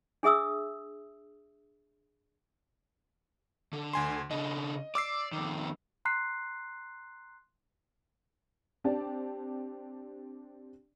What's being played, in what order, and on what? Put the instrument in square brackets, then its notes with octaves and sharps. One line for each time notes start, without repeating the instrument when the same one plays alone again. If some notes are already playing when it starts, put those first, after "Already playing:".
[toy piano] D4 G#4 E5 D#6 E6
[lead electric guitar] D3
[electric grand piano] D2 G#5 C6
[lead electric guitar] C#3 D4 [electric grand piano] D#5
[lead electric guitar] D5 [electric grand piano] D6 E6 C7
[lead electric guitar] F2 D#3
[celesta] A#5 C6 F#6 C7
[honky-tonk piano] C4 D4 G4 D5 A5